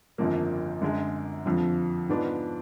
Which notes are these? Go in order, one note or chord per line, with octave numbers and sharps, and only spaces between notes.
G#1 F#2 D3 F3 A#3
F#2 D3 G#3
F2 D3 F3
G#2 F3 B3 D4